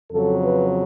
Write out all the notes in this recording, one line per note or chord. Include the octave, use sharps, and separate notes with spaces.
F2 C#3 F#3 A4
B4